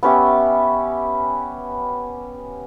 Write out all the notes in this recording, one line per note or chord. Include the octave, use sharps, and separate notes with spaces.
B3 C#4 G4 E5